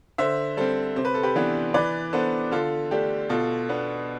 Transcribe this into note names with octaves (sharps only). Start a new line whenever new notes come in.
D3 C5 E5
G3 C4 A4 C5
C3 C5
B4
A4
G4 B4
E3 B3 D4
E3 B4 D5
B3 D4 A4 C5
D3 F4 A4
A3 D4 G4
B2 F4 A4
B3 D4